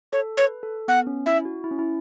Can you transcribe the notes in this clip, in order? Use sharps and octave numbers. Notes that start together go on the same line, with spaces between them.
A4 C#5
B4 C#5
A4
B3 F#5
C#4
E4 E5
F#4
E4
C#4
E4